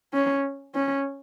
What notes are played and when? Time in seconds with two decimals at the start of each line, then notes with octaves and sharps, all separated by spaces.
0.14 C#4
0.75 C#4